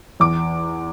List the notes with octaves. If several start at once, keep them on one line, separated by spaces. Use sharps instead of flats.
E2 D6